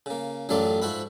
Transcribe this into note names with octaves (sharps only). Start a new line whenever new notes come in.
C#3 A#3
A1 F#2 F#3 A3 F4 D5
G#2 F3 F#4 E5 B5